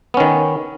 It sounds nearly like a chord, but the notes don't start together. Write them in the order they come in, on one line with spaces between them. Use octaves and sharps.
B3 C#4 D#3